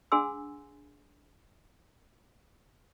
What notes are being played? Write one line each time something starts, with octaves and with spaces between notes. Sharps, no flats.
D4 G#4 F#5 G#5 C6 E6